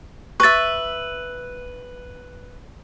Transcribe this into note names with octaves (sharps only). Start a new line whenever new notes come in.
B4 E5 C#6 A6